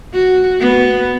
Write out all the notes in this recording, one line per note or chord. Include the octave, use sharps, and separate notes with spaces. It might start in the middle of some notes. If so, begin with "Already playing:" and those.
F#4
B3